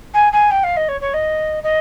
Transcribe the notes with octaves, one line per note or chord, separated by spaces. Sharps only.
G#5
G#5
G5
F5
D#5
C#5
C#5
D#5
D#5